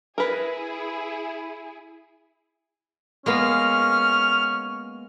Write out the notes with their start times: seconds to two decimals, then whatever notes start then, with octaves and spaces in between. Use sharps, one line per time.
0.18 E4 G#4 A#4 B4
3.26 G#3 A#3 B3 C#4 F6